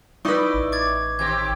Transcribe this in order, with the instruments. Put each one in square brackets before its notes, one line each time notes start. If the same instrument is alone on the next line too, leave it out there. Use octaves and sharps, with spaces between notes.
[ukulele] D#4 B4 [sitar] E4 D5 D#5 [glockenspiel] C#6
[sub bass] A1
[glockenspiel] D6 G#6 A6
[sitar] D#2 C4 G4 [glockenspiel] G#6